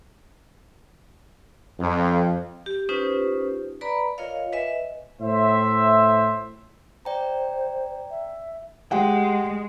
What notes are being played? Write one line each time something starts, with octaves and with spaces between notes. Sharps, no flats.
F2
G4
C#4 D#4 F4 G4 B4 C5
B4 D5 A#5 B5
F4 A#4 C#5 D#5 F5
B4 D#5 E5 G#5
A2 C5 E5
C5 D5 G5 A#5
E5
G#3 G4 F#5 G5